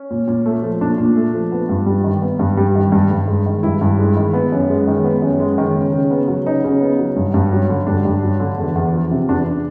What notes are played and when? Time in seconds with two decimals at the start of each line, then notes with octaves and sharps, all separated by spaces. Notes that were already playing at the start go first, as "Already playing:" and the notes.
Already playing: C#4
0.10 A#2
0.28 A#2
0.46 A3
0.62 F3
0.81 A#2 D4
0.98 A#2
1.16 A3
1.34 F3
1.52 B3
1.69 G2
1.86 G3
2.04 D#3
2.22 B3
2.39 G2
2.57 G3
2.75 D#3
2.92 G2
3.10 G2
3.28 G#3
3.46 D#3
3.63 G2 E4
3.81 G2
3.99 G#3
4.17 D#3
4.33 B3
4.52 F#2
4.70 G#3
4.88 D#3
5.04 B3
5.22 F#2
5.40 G#3
5.58 D#3
5.76 C#3
5.92 C#3
6.11 B3
6.28 F#3
6.46 C#3 D#4
6.64 C#3
6.81 B3
6.99 F#3
7.16 G2
7.34 G2
7.52 F#3
7.69 D3
7.87 G2 D4
8.05 G2
8.23 F#3
8.40 D3
8.58 E2
8.75 E2
8.93 F3
9.11 C3
9.28 E2 D4